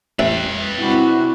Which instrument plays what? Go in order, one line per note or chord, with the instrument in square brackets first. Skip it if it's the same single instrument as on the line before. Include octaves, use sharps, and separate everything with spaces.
[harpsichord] A1 E5 [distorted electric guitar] B4 G5
[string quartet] C3 D4 F#4 [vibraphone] E4 B5